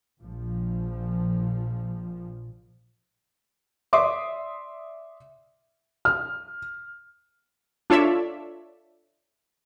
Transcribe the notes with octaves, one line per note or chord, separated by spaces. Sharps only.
A#1 A#2 F3
D5 E5 C6 D6 D#6
F6
D4 F4 A4 C#5 D5 E5